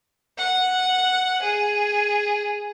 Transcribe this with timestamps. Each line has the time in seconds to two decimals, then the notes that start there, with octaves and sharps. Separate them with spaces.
0.38 F#5
1.42 G#4